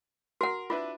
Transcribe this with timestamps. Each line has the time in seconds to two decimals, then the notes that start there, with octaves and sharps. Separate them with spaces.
0.41 F#4 A#4 F#5
0.70 D4 E4 F4 B4